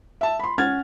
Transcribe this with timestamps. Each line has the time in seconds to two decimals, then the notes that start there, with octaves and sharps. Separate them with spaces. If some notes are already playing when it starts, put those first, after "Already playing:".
0.21 E5 A5
0.39 B5 C6
0.58 C#4 F#5 F6 G#6 A6